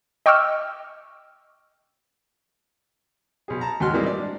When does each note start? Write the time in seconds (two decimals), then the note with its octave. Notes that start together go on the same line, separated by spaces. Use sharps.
0.26 D#5 G5 C#6 D6 E6 F6
3.48 B1 G#4
3.61 A5 A#5
3.80 D#2 G#2 F#4 C6 F6
3.93 A#2 E3 G3 G#3 C4 D#4
4.06 D5
4.19 D4